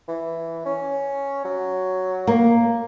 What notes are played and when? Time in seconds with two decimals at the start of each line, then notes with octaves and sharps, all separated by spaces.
0.08 E3
0.66 C#4
1.45 F#3
2.27 A#3